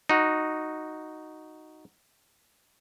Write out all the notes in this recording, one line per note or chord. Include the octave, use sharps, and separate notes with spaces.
D#4 F#4